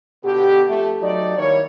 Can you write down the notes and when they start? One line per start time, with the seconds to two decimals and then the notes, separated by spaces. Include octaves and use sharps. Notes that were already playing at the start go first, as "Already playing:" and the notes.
0.24 B2 D3 B3 F#4 G4
0.69 F2 A3
1.02 F#3 A3 D#4 G4 D5
1.38 D#3 G3 A#3 E4 A#4 C#5